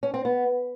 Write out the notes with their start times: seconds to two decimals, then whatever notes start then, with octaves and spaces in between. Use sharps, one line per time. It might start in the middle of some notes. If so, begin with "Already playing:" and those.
0.03 C#4
0.14 C4
0.25 B3